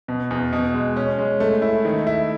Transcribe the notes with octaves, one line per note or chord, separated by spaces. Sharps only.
B2
E2
B2
G#3
C#4
G#3
A3
E4
D#3
E4